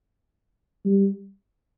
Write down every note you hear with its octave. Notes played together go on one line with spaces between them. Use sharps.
G3